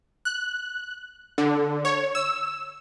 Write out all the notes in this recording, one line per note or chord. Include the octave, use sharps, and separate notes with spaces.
F#6
D3
C#5
E6